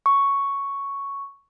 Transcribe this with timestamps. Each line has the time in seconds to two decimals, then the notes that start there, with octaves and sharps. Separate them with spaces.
0.06 C#6